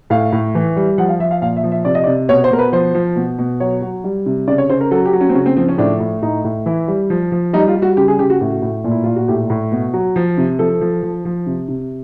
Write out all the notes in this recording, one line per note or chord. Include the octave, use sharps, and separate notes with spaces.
A2 F5
A2
E3
G3
F3 F#5
F5
F3 E5
F5
A#2 F5
E5
F3
E5
C3 D5
D#5
D5
C3
B2 C#5
C5
B2 A#4
B4
F3 C5
F3
B2
B2
F#3 C#5
F#3
G3
C3
C#3 D5
C#5
C#3 C5
A#4
F#3 A4
G4
F#3
C#4
C4
C#3 C#4
C4
F3 C4
C#4
A2 D4
A2
A2 D#4
A2
E3 E4
G3
F3
F3
G3 D#4
F4
G3
F#4
C#3 G4
G#4
C#3 G4
F#4
A2 F#4
A2
A#2
E4
A#2 F4
F#4
A2 G4
A2
B2
F#3
F3
C3
F3 A4
F3
F3
F3
C3
C3